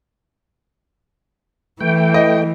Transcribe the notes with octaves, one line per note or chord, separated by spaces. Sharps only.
E3 A3 G5
D#5